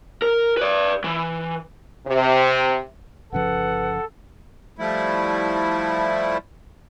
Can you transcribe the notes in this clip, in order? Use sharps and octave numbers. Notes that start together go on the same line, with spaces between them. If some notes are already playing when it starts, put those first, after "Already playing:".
A#4
B4 D5
E3
C3
G1 C#3 F3 A4 B4 F#5
F3 G3 A3 E4